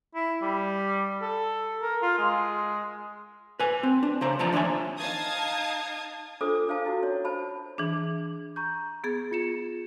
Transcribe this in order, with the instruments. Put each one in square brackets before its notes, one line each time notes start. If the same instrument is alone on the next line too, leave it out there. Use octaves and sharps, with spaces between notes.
[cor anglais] E4
G3
A4
A#4
F4
G#3
[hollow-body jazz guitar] B4 G#5
C4
D4
C#3 C5 A#5
E2 F3 D5 A5 A#5
D#2 D4 C#5 E5 G#5
[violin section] D#4 F5 A5 D#6 G#6
[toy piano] D4 F4 A4 C5 D6 D#6
D4 C5 F5 A5
E4 F#4
C#4 C#5
C5 A5 B5
[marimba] E3 D4 [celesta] G#4 D6 F#7
[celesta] A#5 C#6 G6
[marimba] B3 G#4 A6
[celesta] F4 C#7 E7